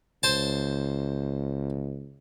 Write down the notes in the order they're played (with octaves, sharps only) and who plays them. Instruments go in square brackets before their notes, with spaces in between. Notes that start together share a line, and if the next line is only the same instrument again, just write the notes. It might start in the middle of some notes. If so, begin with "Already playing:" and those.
[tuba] C#2 [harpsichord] C5 A5